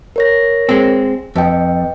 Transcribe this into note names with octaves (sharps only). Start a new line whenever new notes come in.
A#4 C#5 A#6
G#3 C4
F2 B4 D#5 G5